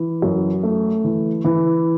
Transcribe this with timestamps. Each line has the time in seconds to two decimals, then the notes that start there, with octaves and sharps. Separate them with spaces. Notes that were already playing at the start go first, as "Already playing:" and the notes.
Already playing: E3
0.22 F#2
0.63 A3
1.04 E3
1.44 E3